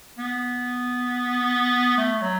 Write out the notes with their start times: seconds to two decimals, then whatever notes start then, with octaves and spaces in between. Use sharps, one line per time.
0.18 B3
1.98 A3
2.22 F#3